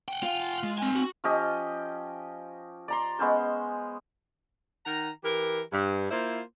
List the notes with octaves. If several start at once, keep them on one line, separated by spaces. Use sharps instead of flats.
F#5 G5
F4
G#3
C4 G#5
F#4
F3 C#4 G4 D#5
D5 A#5 C6
G#3 B3 C#4 C5
D#3 F#5 A#5
E3 G4 A#4
G2
A#3 E4 F4 C5